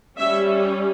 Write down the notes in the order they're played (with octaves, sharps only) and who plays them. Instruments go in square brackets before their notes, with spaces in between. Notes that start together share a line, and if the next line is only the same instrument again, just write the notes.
[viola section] G3 C#4 E5